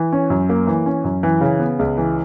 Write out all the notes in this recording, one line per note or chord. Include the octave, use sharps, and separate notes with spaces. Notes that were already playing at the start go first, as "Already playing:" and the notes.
Already playing: E3
C#4
F#2
A#3
E3
C#4
F#2
E3
C#3
B3
C#2
E3